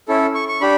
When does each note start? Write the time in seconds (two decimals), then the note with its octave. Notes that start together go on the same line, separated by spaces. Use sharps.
0.08 C#4 E4 A4
0.35 C#6
0.48 C#6
0.61 D4 G4 B5